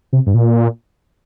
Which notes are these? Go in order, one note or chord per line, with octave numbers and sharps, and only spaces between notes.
C3
G2
A#2